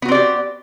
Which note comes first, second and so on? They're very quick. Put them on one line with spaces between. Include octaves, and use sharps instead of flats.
B3 F#4 C4 D5 G4